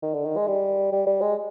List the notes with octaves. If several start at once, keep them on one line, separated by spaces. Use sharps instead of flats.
D#3
D3
D#3
G#3
G3
G3
G3
G#3